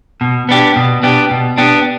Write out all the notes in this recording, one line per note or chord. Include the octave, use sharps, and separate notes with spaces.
B2
B3 D4 G4
B2
B3 D4 G4
B2
B3 D4 G4